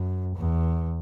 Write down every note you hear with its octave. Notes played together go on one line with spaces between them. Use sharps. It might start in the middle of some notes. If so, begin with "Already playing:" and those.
Already playing: F#2
E2